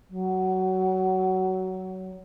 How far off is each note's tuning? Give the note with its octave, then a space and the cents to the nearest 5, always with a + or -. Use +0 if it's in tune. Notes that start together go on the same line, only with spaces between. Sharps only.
F#3 +20